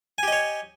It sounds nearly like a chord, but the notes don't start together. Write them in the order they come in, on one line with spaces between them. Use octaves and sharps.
G#5 G4 D#5 C#5